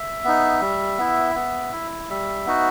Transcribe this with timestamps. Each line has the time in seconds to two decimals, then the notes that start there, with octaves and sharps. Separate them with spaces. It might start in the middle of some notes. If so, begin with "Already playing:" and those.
Already playing: E5
0.24 B3 D#4
0.61 G3
0.98 B3 E4
1.35 B3
1.72 E4
2.09 G3 E5
2.46 B3 D#4 F#4